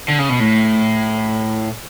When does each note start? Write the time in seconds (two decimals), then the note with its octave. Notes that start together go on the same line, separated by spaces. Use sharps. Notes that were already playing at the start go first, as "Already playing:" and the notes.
0.08 D3
0.18 C#3
0.29 B2
0.39 A2